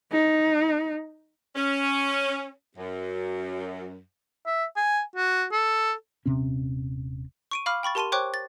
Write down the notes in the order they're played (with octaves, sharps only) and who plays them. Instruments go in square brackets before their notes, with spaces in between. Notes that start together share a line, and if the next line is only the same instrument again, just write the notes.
[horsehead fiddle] D#4
[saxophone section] C#4
F#2
[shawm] E5
G#5
F#4
A4
[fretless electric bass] D#1 C3 C4 C#4
[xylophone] C#6 D7 D#7
F5 B5 D6 F6
G5 B5 C#6 A6
G4 A#4 A5 C6 D#7 G7
C5 C#5 G5 C#6 D6 F#6
A6